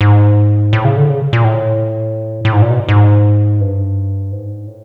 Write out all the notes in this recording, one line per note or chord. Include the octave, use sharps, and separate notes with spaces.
G#2
A2
C#3
D3
C#3
A#2
A2
A2
G#2
A#2
B2
G#2
G2
G#2
A2